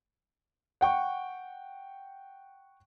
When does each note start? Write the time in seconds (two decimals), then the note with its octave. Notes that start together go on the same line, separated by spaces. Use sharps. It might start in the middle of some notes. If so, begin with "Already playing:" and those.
0.81 F#5 G5 C#6